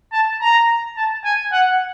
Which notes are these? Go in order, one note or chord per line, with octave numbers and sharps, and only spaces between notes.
A5
A#5
A5
G#5
F#5